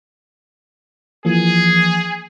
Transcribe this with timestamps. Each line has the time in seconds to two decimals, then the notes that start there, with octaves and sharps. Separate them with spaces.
1.25 E3 F3 A#3 G#4